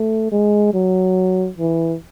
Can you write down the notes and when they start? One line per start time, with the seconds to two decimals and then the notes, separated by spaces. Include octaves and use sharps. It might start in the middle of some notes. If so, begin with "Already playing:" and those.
Already playing: A3
0.32 G#3
0.74 F#3
1.58 E3